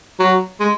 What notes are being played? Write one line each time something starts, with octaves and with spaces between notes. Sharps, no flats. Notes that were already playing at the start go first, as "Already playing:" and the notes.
F#3
G#3